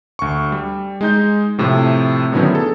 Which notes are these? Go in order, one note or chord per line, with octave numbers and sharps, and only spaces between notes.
D2 C#6
G3
G#3 D#4 G6
A2 C3 F3 A3
A2 D3 D#3 F#3 B3 C#4
G#4 A4